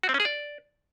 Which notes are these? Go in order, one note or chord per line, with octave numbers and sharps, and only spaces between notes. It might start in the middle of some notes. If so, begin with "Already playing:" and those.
F#4
C4
C#4
G#4
D5